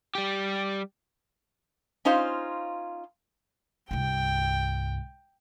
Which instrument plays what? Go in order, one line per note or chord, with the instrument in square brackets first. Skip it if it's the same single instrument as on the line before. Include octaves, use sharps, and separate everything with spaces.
[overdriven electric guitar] G3 G4
[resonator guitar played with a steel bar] C#4 D#4 F4 C5 F5
[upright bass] C2 G2 [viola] G5